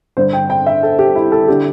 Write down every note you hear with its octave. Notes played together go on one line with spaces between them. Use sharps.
G2 D3 C5
G5
G5
E5
A4
G4
E4
A4
D3 G4